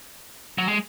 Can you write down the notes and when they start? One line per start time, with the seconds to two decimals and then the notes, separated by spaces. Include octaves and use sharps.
0.58 F#3
0.68 G#3